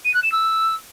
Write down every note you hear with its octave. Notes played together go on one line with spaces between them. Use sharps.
D#7
F#6
E7
E6